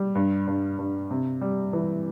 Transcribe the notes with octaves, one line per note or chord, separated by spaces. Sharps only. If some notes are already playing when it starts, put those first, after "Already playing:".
Already playing: G3
G2
G2
G2
C3
G3
E3